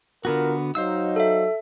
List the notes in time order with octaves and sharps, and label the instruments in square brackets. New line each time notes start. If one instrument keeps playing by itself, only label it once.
[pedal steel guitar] D3 B3 F#4 [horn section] F4 A#4
[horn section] F#3 D#4 [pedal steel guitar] C5 F5 E6
[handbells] A4 E5